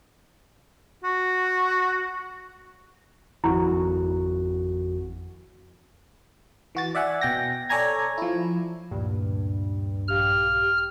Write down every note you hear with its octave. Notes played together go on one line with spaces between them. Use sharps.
F#4
G#1 F2 E4 F#4
E3 F#4 A6
D5 E5 F#5 G#5
B2 G5 A#6
A4 C#5 D5 G#5 A#5 G#6
F3 E4
D2 G2 A#2
A#1 G4 F5 F6